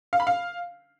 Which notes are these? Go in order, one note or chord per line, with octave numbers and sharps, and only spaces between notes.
F5
B5
F5